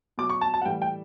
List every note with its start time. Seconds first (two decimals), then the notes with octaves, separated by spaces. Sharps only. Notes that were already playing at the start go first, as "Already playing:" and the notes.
0.18 B2 F#3 D6
0.30 C#6
0.41 A5
0.54 A5
0.62 F#5
0.65 A2 E3 G3 G5
0.82 G5